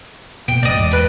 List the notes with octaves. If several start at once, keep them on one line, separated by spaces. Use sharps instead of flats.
B2 A#3 G5
F1 F#2 A2 D5 D#5
E2 G#2
B4 G5